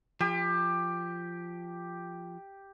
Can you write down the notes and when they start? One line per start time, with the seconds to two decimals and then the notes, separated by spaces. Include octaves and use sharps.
0.21 F3 G4